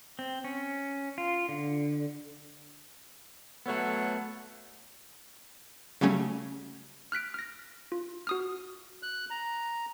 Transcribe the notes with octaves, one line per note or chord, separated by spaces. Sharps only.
C4
C#4
F4
D3
F#3 A3 B3 A4 C#5
C#3 F#3 G3 A3 C#4
F6 F#6 B6 D7
F6 A#6
F4
F#4 D#6 F6
F#6
A#5